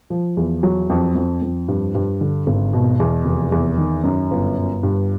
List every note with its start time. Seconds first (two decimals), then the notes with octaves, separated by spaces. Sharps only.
0.10 F3
0.37 E2
0.63 F#3
0.90 F2
1.15 F2
1.42 F2
1.68 G2
1.95 G2
2.21 D3
2.47 G#1
2.73 B2
3.00 E2
3.25 F1
3.52 E2
3.78 D#3
4.04 F#2
4.31 G1
4.57 G1
4.83 G2